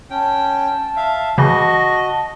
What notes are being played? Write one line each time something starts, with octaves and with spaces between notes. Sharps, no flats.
C#4 G5 A5
E5 F5
C#3 E3 F#4 D#5